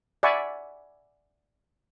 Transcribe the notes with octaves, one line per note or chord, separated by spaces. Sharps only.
D5 E5 F#5 G#5 B5 C#6